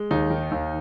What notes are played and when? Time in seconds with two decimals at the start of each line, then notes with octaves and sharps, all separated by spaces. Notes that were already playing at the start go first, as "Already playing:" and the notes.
Already playing: G#3
0.11 D#2 D#4
0.30 D#3
0.51 D#2